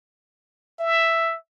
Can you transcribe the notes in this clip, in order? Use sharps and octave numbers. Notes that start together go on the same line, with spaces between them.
E5